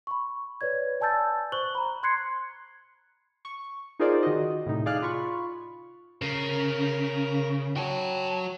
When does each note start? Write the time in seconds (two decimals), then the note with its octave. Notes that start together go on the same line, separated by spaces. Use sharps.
0.07 B5 C#6
0.61 B4 C#5 D5 G#6
1.00 D5 G#5 A5 E6 G6 A6
1.52 C5 C#6 F#6 F#7 G7
1.75 A#5 B5
2.03 C6 F#6 G#6 C7 C#7
3.45 C#6
3.99 D#4 F4 G#4 A#4 C5 D5
4.23 D#3 F#4 D#5
4.66 A2 C3 D#4
4.86 G#4 D5 F5 F6 F#6
5.02 F4 B5 C#6
6.22 C#3 A#4
7.76 F#4 C#5 G5 A5